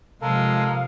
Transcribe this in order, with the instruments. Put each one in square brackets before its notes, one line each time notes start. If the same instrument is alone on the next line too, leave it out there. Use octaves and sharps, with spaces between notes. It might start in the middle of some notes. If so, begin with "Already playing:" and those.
[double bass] C3 F3 [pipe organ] G#3 [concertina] A4 A#4 [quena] F5